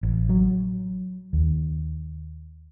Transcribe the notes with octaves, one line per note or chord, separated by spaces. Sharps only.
A1
F#3
D#2